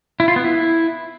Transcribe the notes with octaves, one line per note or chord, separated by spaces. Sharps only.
E4
F4
B3
E4